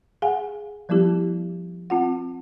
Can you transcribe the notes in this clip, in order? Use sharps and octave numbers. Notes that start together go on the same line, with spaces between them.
G#4 F5 F#5 G#5
F3 G3 B3 E4 G4
C4 F4 F#5